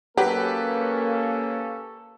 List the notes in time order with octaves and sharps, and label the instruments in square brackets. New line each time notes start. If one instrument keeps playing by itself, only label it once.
[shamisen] F#3 [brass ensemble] A#3 C#4 [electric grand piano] G4 B4 [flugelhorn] A4